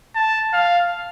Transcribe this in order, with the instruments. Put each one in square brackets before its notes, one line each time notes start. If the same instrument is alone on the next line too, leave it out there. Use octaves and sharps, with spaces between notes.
[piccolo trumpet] A5
F5